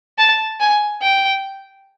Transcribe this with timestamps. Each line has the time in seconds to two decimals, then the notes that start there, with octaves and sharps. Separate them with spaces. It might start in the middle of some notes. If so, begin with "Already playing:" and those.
0.18 A5
0.60 G#5
1.02 G5